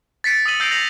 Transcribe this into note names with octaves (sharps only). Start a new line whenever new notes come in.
A6 B6 C#7 D7
D#6 E6 B6 D#7 F#7
E6 G6 A#6 C7 D7 F7
G6 A6 A#6 C7 F7 F#7